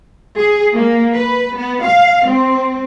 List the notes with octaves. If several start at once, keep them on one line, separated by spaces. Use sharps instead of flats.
G#4
A#3
B4
B3
F5
C4